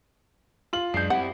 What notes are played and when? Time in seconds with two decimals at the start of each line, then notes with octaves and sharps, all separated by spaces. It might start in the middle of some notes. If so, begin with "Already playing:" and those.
0.73 F4 F#7
0.94 F#2 G#3 D4 G6 C7
1.10 C4 E4 G4 F#5